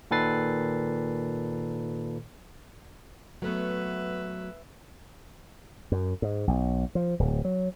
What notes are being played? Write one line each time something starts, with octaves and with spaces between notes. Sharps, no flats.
A#2 D#3 A4 B4 A6 C7
F#3 A3 B3 B4 E5
F#2
G#2
B1
F3
D1
F#3